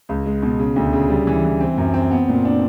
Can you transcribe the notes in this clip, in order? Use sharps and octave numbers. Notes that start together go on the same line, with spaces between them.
C#2
G#3
B2
C#3
D2
C#3
G3
E3
E3
C4
F#2
C4
B3
A#2
D4